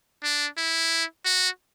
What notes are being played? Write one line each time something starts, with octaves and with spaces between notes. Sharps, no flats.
D4
E4
F#4